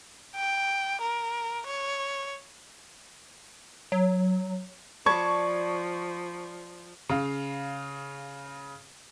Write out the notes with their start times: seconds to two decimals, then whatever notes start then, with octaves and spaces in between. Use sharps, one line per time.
0.36 G5
1.02 A#4
1.67 C#5
3.92 F#3
5.06 F3 D5 A5 B5 C#6 G#6
7.09 C#3 F5